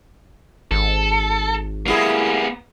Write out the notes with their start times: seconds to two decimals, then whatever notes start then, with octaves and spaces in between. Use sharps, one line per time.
0.71 G#1 A4
1.86 G3 A#3 B3 E4 G#4